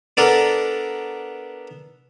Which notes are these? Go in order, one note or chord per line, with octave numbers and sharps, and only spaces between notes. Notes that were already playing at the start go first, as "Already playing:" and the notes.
B3 D4 A4 A#4 D5 A#5